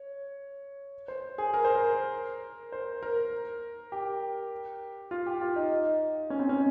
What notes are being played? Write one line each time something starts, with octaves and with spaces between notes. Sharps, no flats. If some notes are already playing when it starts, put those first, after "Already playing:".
Already playing: C#5
C5
G#4
A#4
C5
A#4
C5
A#4
G4
F4
G4
F4
D#4
C#4
C4
C#4